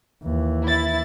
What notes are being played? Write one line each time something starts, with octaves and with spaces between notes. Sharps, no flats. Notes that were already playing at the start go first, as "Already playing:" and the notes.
D#2 E3
E4 A6